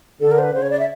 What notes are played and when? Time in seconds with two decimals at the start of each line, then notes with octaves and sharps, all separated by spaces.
0.21 D3 A4
0.31 A#4
0.38 C5
0.43 B4
0.54 C#3 C5
0.62 C#5
0.70 D5
0.79 E5